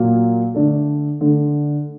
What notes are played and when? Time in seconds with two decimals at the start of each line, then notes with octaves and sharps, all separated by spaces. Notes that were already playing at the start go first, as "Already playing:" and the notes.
Already playing: A#2 F#3 A#3
0.54 D3 A3 D4 A4
1.21 D3 A3 D4 A4